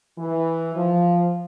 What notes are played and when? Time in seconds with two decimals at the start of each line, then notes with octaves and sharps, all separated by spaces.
0.18 E3
0.75 F3